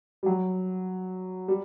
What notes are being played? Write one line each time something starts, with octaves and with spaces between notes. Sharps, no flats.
G3
F#3
G3